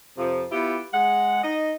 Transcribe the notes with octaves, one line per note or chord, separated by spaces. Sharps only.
F2 C3 F3
B3 E4 F4 G4
G#3 F#5
D#4 D#5